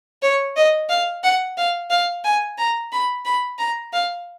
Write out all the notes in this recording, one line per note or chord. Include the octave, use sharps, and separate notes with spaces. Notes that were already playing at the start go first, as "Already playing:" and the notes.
C#5
D#5
F5
F#5
F5
F5
G#5
A#5
B5
B5
A#5
F5